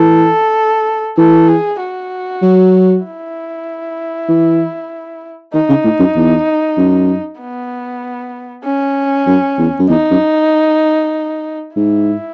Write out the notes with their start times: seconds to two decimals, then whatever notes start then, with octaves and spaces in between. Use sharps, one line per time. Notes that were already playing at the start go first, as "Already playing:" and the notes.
Already playing: E3 A4
1.17 E3 A4
1.48 G#4
1.80 F#4
2.42 F#3
3.05 E4
4.29 E3
5.53 D#3 D#4
5.69 C#3
5.84 A2
5.99 F#2
6.16 E2
6.77 F#2
7.39 B3
8.64 C#4
9.27 F#2
9.58 E2
9.79 F#2
9.89 E2 D#4
10.10 F#2
11.76 G#2 E4